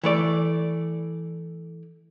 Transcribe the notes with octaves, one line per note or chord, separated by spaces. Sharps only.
E3 A3 D5